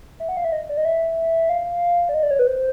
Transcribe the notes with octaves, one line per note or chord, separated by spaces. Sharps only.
E5
F#5
F5
E5
D#5
D5
D#5
E5
F5
D5
D#5
D5
C#5
B4
C5